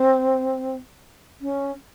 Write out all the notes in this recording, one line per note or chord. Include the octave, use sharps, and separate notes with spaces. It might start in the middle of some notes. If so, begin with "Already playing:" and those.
Already playing: C4
C#4